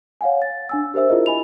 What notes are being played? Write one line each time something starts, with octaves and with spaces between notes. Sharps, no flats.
C#5 F5 F#5 G#5
A6
D4 G#5 E6
G4 A#4 C5 E5 E6
E4 F4 G#4 A#4 D#5
E4 G#5 B5 F7